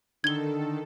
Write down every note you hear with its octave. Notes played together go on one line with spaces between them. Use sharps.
D3 D#3 A4 G#6 G7